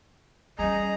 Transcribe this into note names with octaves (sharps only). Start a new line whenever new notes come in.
G3 C#4 G#4 D#5 A#5